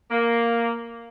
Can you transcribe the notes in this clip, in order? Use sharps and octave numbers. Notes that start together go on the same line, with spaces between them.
A#3